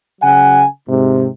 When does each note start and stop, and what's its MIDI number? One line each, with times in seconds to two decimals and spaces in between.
0.21 0.63 49
0.21 0.63 54
0.21 0.63 78
0.21 0.63 80
0.88 1.27 44
0.88 1.27 48